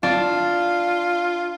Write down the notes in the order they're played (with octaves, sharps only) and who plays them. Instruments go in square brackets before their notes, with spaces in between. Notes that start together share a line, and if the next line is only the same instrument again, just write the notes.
[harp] D4 [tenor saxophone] F4